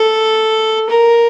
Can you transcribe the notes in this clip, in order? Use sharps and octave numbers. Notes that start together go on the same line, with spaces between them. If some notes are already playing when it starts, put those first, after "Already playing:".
Already playing: A4
A#4